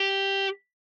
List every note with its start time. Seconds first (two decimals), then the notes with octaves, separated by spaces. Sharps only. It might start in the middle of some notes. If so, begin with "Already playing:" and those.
Already playing: G4